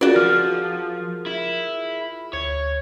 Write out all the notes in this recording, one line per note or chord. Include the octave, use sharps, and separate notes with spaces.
F4 F#4 G#4 A#4 D5
F3 F6
E4
D2 C#5